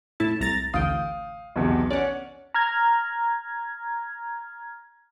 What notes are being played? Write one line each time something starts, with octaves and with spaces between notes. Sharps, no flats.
A2 E4 A5
C2 A#5 A6
A1 D2 F5 G5 D#6
B1 E2 C3
C#4 D5 F#5
A#5 F6 G#6